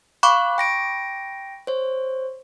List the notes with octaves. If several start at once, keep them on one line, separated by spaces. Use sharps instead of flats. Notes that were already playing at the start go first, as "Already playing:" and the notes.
F5 B5 C#6 D6 F#6
G5 A#6 D7
C5 C#5